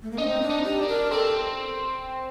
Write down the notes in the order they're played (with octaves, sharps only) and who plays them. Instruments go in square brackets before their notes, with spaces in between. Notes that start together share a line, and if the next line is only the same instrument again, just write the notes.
[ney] A3
A#3
[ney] D4 [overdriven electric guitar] D#4
[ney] C4
D4
[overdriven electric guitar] D#4
[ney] G4
[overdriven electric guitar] D4
[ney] A#4
[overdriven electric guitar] C4 [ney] A4